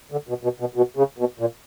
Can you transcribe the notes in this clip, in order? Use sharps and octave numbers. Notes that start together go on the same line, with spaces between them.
D3
B2
B2
B2
B2
C#3
B2
A#2